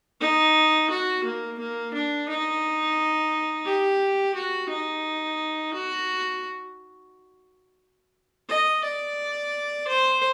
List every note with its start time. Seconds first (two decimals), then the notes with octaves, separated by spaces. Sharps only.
0.21 D#4
0.90 F#4
1.24 A#3
1.59 A#3
1.94 D4
2.28 D#4
3.66 G4
4.35 F#4
4.69 D#4
5.73 F#4
8.49 D#5
8.84 D5
9.88 C5